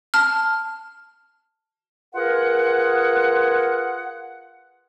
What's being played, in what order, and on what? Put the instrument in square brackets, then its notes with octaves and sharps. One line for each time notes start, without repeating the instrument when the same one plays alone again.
[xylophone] A5 F6
[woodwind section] F4 G#4 A#4 B4 F#5